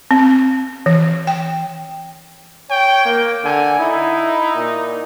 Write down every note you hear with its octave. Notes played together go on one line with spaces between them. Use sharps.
C4
E3
G5
C#5 G5
A#3
D3 G#5
D#4 E4
A#2